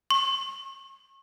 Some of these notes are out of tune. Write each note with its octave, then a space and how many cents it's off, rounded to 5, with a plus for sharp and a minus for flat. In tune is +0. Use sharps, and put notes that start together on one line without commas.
C#6 -35